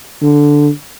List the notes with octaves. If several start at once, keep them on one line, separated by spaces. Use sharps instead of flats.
D3